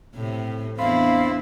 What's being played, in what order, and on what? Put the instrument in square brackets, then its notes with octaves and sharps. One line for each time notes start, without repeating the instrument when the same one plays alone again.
[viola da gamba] A2 C3
[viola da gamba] E2 D4 E4 [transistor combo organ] C4 B5 [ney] F5